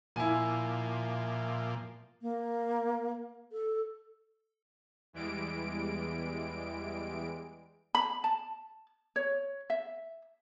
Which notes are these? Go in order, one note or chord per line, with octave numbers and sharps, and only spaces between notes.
A#2 F3 E4 G#5
A#3
A4
E2 E3 G3 G#3 D7
B5
A5
C#5
E5